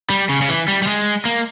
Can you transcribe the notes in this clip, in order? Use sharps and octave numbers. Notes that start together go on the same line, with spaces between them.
G3
C#3
C#3
E3
G3
G3
G#3
A#3